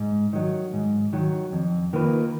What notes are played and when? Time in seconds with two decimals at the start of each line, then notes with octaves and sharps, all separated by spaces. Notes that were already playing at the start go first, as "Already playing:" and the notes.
Already playing: G#2
0.33 D#3 F#3
0.73 G#2
1.13 D#3 F#3
1.52 F2
1.93 D#3 A#3 F4 B4